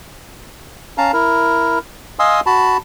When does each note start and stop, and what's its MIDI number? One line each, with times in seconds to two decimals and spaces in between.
0.98 1.12 61
0.98 1.12 77
0.98 1.12 81
0.98 1.12 82
1.13 1.79 64
1.13 1.79 70
2.19 2.40 75
2.19 2.40 77
2.19 2.40 80
2.19 2.40 84
2.19 2.40 87
2.19 2.40 88
2.46 2.77 66
2.46 2.77 81
2.46 2.77 83